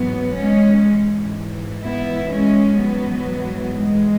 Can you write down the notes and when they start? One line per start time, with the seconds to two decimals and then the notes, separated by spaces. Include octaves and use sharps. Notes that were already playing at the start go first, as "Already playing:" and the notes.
Already playing: G#2 E3 F#3 B3
0.39 G#3 C#4
0.88 G#2 E3
1.84 B3 E4
2.32 G#3 C#4
2.80 G#2 E3 F#3 B3
3.76 G#3